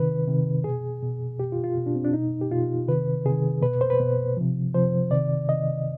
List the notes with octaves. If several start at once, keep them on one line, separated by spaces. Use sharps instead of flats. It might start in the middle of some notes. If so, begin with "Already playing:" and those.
Already playing: C3 D#3 B4
C3 D#3
B2 G#4
B2
B2 G4
F4
F4
B2
D4
C4
D4
B2 D#4
G4
B2 F4
C3 D#3 B4
C3 D#3 G#4
B2 B4
C5
B4
B2
C3 F3
C3 F3 C5
C3 D#3 D5
C3 D#3 D#5